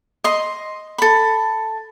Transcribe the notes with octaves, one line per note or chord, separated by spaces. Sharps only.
D#5 C6
A4 B5